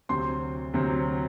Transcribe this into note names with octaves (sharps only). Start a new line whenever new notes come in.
D2 C3 F#3 C4 C6
D2 C3 F#3 C4